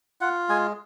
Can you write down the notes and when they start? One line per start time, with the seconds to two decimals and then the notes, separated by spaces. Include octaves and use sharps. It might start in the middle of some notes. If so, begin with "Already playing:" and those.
0.21 F4 F#5
0.49 G#3 G#5